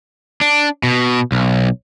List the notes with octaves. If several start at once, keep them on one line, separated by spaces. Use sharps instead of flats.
D4
B2
B1